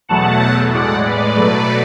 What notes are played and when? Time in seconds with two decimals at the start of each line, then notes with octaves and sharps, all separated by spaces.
0.09 E2 B2 F#3 A3 F#5 A5
0.73 A2 G#3 D5 F#5
1.05 B4 D5
1.36 B2 F#3 A3